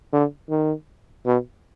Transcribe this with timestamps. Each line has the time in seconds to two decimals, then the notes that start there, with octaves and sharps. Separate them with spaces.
0.13 D3
0.50 D#3
1.26 B2